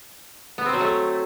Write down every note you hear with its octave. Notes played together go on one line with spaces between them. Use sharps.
B3
C4
F#3
A3